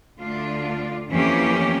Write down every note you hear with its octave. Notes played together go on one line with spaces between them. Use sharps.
D2 D3 A3 D4 F4
F2 E3 A#3 C#4 G4